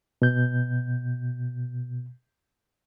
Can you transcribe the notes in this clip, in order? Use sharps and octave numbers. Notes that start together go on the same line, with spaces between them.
B2 G6